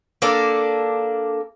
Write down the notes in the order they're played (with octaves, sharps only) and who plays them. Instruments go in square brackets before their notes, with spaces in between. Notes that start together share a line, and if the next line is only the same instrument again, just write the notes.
[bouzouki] A#3 D4 A4